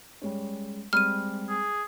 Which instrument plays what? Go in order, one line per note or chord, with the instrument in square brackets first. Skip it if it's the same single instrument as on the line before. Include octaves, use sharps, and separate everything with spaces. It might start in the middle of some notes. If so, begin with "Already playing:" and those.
[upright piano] G3 G#3 C#4
[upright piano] G3 G#3 C4 [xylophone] F6 D#7
[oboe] G#4